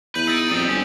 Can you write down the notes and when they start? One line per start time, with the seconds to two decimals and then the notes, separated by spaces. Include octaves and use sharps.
0.15 E2 B4 G6 D#7 F#7
0.28 D#4 E6 A6 D7
0.51 F2 G3 D#4 D#6
0.69 G1 C4 C#4